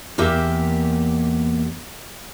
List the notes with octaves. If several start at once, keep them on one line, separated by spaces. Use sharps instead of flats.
E2 A#3 G4 E5